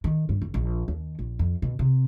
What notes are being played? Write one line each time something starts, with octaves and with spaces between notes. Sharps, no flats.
D#3
G2
F#1
A#1
D#2
A#1
F2
B2
C3